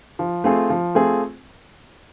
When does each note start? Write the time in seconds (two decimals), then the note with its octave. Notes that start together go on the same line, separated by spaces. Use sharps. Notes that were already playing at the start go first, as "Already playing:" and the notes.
0.19 F3
0.44 A3 C4 F4 G#4
0.70 F3
0.95 A3 C4 F4 G#4